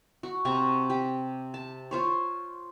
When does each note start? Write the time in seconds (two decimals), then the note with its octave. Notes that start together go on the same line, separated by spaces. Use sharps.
0.23 F#4
0.45 C3 C4 A#5 C#6
0.90 G4
1.54 A5
1.91 F4 C5 C#5